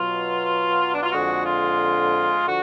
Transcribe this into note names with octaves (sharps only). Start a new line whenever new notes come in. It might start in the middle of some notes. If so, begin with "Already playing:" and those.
Already playing: B2 F#3 F4
D4
F4
F2 D3 G#3 F#4
F4
D3 F3 F#4